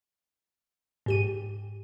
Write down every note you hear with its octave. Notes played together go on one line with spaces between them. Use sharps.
G#2 G4 D#7